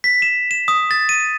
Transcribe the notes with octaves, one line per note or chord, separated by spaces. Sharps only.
B6
E7
E7
D#6
A6
D#7